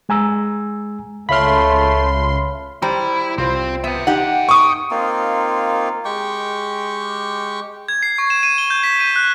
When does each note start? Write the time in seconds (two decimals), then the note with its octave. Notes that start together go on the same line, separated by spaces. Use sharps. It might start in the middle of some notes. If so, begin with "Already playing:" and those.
0.09 G#3 G#5 A#5 E6
1.29 C#2 A3 C#5 E5 F5 B5 C6 F6
2.82 G3 E4 C5 G5 A#5
3.38 C2 C4 F4 C5
3.84 B3 E5 G5
4.07 D#4 G4 F#5
4.49 C#6 D#6
4.91 A#3 C4 D#4 F4
6.05 G#3 G4 G5 C#6
7.88 G#6
8.03 C7
8.18 C#6
8.30 E7
8.43 D#7
8.58 G7
8.70 G6
8.83 B6
9.00 D#7
9.16 F#6